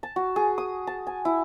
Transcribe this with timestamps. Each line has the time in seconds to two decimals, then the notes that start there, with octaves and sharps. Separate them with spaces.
0.03 A5
0.16 F#4
0.36 G#4
0.58 D#6
0.87 A5
1.07 G#5
1.25 E4